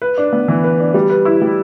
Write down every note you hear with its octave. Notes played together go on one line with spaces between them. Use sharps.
B4
D4
B3
E3
B4
D4
G3
B4
E4
G3